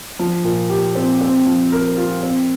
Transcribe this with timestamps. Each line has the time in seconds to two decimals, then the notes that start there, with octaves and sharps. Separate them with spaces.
0.19 F3
0.44 A#2
0.70 G4
0.95 C4
1.21 C4
1.46 F3
1.72 A#4
1.97 F4
2.23 C4